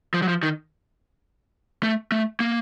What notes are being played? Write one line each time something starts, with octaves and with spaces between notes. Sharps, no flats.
F3
F#3
F3
D#3
A3
A3
A#3